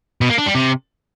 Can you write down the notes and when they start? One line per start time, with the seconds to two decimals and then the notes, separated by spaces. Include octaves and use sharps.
0.21 B2
0.30 A#3
0.38 D4
0.47 G3
0.55 C3